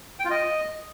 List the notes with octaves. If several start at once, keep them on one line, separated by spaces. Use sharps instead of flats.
G5
F4
D#5